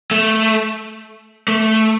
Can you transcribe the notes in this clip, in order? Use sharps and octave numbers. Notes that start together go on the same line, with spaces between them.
A3
A3